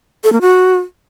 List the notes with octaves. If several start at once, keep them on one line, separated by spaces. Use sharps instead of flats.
A4
A#3
F#4